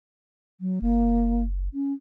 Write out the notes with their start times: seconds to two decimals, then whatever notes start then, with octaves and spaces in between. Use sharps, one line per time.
0.61 F#3
0.82 F#1 A#3
1.74 C#4